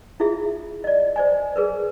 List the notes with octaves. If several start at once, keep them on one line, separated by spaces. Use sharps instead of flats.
E4 F4 G#4 E5
D5 D#5
C5 D5 G#5
G#4 A#4 B4